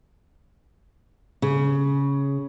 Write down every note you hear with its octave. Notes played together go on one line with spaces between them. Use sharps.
C#3